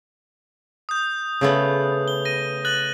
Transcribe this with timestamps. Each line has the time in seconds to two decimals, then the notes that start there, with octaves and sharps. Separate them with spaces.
0.89 D#6 G6
1.41 C#3 A3 B3
2.08 G7
2.25 A#6 D#7
2.65 F#6 A6 F#7